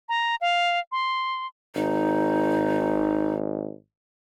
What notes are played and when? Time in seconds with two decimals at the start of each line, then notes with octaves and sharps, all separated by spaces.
0.09 A#5
0.41 F5
0.92 C6
1.75 G#1 D#4